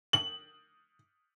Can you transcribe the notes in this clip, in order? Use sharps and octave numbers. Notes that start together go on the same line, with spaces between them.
F#7